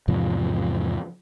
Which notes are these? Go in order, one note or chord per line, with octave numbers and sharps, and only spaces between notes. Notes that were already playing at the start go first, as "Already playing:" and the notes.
E2 G#2 C3 F3